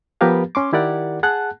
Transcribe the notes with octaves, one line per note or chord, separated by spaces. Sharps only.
F3 B3 G4 A#4 B4 F5
C#4 C6 D6
D#3 E4 G4 A#4 D5 F#5
G#4 F#5 A5 F#6